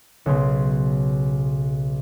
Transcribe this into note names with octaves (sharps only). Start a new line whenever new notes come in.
B1 C#3 C6